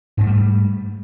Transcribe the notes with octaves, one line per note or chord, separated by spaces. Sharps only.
G#2 G3 A3 B3